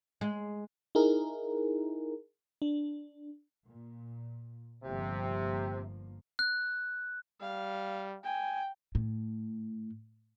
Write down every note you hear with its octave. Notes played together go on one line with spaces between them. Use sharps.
G#3
D#4 E4 G#4 A#4
D4
A#2
G1 C3 F3 A#3
F#6
G3 F5
G5 G#5
A2